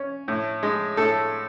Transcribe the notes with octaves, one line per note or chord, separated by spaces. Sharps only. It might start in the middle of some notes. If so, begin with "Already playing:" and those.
Already playing: C#4
A2
G#3
A2 A4